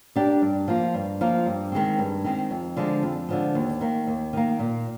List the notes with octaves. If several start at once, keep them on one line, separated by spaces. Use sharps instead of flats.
D4 G4 A#4 D5
G2
F3 A#3 F4
G2
F3 A#3 F4
G2
D#3 G#3 C4
G2
D#3 G#3 C4
F2
D3 F3 G#3
F2
D3 F3 G#3
D#2
D#3 A#3
D#2
D#3 A#3
A#2